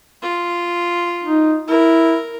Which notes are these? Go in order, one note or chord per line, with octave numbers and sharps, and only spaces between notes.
F4
D#4
E4 A#4